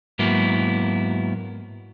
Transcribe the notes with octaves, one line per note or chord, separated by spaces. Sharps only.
G#2 F#3 A#3 B3 E4